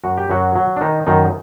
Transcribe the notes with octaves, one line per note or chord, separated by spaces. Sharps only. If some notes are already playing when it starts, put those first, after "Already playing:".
F#2 F#4
G4
F#2 F#3 F#4
F#3
D4
D#3 D#4
F#2 D#3 D#4